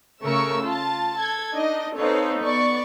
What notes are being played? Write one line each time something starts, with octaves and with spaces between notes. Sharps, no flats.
C#3 A3 A#4 C#6 E6
F4 A5
A4 G#6
D4 D#4 D#5
C4 D#4 A4 B4 C#5 F5
B3 D5 C#6